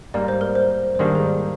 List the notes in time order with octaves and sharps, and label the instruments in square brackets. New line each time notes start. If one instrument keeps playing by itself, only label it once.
[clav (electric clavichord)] G#2 G3 A#3 D#4 [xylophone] D5
[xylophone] C5
A#4
C5
C5
[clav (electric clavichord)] G#2 D#3 G3 A#3 D4 [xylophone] D5
[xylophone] G#4
A#4